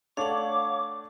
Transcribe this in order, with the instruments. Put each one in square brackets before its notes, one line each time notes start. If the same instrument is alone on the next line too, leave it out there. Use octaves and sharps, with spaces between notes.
[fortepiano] A3 D4 A4 [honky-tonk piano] C#5 [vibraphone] F5 F#5 [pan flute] D6